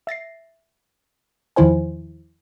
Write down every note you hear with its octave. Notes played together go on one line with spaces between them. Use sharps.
E5 A6 A#6 C7
E2 D#3 F3 E4 C5 G#5